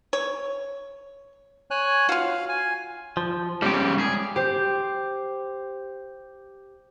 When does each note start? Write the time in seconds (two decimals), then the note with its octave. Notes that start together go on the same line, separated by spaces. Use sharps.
0.13 C#5
1.71 C#5 G#5 F#6
2.09 F4 F#4 F5
2.49 G#5
3.17 F3
3.62 G#2 C#3 G3 G4
3.99 G#4
4.36 G4 C5